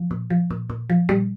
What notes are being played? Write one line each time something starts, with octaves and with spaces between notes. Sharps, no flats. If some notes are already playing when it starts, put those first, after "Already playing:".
Already playing: F3
A#2
F3
A#2
A#2
F3
A#2 G3